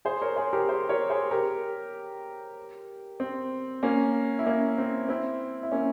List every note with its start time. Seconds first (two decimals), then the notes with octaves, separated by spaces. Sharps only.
0.05 G#4 C5
0.22 A#4 C#5
0.36 G#4 C5
0.53 G4 A#4
0.68 G#4 C5
0.89 A#4 C#5
1.10 G#4 C5
1.31 G4 A#4
3.20 C4
3.83 A#3 C#4
4.39 E4
4.46 A#3 C#4
4.78 C4
5.09 C4 E4
5.63 E4
5.72 A#3 C#4